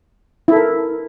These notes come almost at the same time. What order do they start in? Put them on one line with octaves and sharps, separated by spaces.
E4 A4 A#4